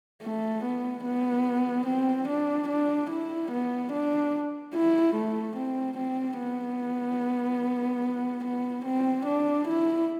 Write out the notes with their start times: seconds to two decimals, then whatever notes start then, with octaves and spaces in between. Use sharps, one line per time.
0.23 A3
0.64 B3
1.04 B3
1.87 C4
2.28 D4
2.69 D4
3.10 E4
3.51 B3
3.92 D4
4.75 E4
5.15 A3
5.57 C4
5.98 C4
6.39 B3
8.45 B3
8.85 C4
9.26 D4
9.68 E4